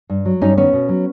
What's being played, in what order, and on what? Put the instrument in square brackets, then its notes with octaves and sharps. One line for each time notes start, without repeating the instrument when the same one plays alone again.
[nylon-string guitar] G2
F#3
G2 C#4 D#4
D#3 B3 C#4
B2
F#3